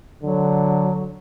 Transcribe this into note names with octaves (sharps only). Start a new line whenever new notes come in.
D3 F#3